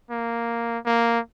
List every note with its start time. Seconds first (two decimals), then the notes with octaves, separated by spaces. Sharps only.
0.11 A#3
0.86 A#3